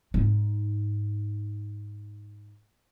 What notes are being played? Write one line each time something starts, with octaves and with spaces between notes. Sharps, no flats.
G#2 D#4